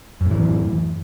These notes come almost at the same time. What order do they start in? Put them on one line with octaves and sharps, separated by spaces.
F#2 A2 E3